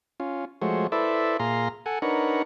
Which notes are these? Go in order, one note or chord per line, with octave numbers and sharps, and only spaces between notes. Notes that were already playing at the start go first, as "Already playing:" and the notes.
C#4 F4
F3 G#3 A3 F#4 C5 C#5
E4 A4 B4 C5 D5 E5
A#2 G#4 F5 A#5 C6
A4 F#5 G#5
D4 D#4 A#4 B4 C#5 F#5